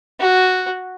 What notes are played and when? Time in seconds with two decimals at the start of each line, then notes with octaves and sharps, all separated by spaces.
0.20 F#4